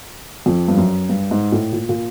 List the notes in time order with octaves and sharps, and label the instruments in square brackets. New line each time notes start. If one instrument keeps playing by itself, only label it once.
[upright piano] F2
G2
F#2
G2
G#2
A2
A#2
A#2